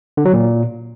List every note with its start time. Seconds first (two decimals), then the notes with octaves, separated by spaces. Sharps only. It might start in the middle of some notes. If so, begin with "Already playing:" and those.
0.17 D3
0.25 F#3
0.33 A#2